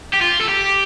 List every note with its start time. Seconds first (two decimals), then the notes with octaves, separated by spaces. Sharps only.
0.13 G4
0.21 F4
0.41 A4
0.49 G4